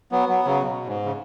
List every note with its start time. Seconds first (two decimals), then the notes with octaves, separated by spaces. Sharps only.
0.12 F#3 B3
0.29 F#3 B3
0.45 C#3 F#3
0.62 B2
0.87 G#2
1.05 C#3